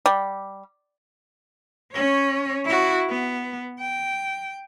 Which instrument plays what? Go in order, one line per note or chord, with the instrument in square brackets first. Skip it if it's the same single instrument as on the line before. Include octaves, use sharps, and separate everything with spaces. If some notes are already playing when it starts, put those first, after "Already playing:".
[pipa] G3
[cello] C#4 C#5
E4 F#4
B3
G5